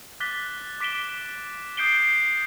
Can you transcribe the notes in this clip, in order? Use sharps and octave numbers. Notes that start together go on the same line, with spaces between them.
D6 F#6 A6 B6 G7
D6 B6 D7 E7 G7
D#6 G6 C7 D7 G7